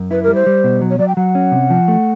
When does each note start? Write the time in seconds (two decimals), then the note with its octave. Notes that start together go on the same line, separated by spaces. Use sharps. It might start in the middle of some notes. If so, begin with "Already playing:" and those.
Already playing: F#2
0.11 E4 B4
0.23 G3 A#4
0.35 C5
0.46 G3
0.64 B2
0.81 F#3
0.90 C#5
0.99 F#3 D5
1.08 G5
1.17 F#3 F#5
1.35 C#4
1.52 C3
1.70 F3
1.88 A3